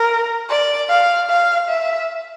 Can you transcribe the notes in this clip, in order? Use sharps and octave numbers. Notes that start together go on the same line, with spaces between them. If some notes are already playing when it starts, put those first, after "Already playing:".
Already playing: A#4
D5
F5
F5
E5